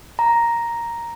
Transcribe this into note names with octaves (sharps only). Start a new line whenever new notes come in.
A#5